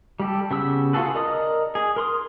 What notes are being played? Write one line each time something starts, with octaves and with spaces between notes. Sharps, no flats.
G3 G4 A4
C#3 B3 G4 E6
F4 F#4 G#4 A4 B4
A#4 D5 D#5 D#6
G#4
A#4 C6 D#6